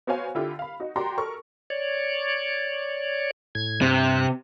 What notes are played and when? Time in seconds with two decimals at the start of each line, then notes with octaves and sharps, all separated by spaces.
0.07 B3 F#4 C5 C#5 F5 G#5
0.35 D3 E4 F4 G4
0.59 F5 B5
0.80 D#4 F#4
0.96 F#4 G4 D5 G5 A#5 C6
1.18 A4 A#4 C#6
1.70 C#5 D5
3.55 A2 G#6
3.82 G2 C3 F#6